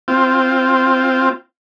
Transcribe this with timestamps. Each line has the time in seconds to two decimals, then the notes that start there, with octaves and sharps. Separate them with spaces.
0.08 C4 F4